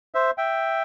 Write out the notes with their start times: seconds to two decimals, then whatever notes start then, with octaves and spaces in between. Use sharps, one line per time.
0.14 C5 E5
0.38 E5 G5